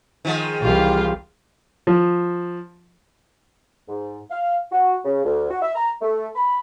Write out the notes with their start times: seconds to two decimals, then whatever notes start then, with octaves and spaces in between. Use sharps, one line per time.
0.25 D#3 F3 G#3
0.61 C2 E3 F4 G4 F5
1.87 F3
3.89 G#2
4.31 F5
4.72 F#4
5.05 C#3
5.24 D2
5.51 F#4
5.62 E5
5.75 A#5
6.02 A3
6.36 B5